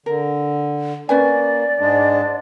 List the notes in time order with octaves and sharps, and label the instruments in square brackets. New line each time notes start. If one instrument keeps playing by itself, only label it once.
[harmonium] D3 [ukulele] A#4
[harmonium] A#3 [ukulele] C#4 B4 G#5 [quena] D5
[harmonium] G#2 G#3 D4